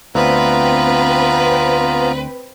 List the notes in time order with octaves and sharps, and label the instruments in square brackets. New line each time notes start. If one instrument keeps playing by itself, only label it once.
[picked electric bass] D2 [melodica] B3 F4 A#5 [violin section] C4 B4